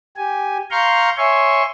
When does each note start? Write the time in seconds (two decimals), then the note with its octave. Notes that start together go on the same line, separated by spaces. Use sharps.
0.16 G4 G#5
0.71 F5 A#5 C6 C#6 F6 G6
1.17 C#5 E5 G#5 C6 C#6